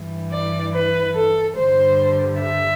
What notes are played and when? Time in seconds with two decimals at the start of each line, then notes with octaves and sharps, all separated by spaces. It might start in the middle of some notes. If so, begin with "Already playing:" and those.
Already playing: G2 E3 G3
0.32 D5
0.74 B4
1.16 A4
1.57 G2 D3 G3 C5
2.41 E5